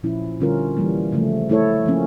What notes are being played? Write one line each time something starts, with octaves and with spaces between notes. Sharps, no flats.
A#2 F3 C#4 E4
D3 G3 C#4 F4 A#4
E3 G3 A#3
C#3 F3 A3
A3 E4 A4 C#5
F3 A#3 C#4